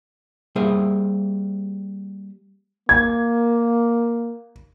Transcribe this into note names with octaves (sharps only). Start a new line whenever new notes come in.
G3 A#3 G#4 C5 E5
A#3 G#6